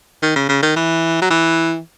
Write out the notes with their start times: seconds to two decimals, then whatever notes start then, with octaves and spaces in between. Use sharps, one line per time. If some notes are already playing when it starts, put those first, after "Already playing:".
0.22 D#3
0.36 C#3
0.49 C#3
0.63 D#3
0.76 E3
1.22 F#3
1.30 E3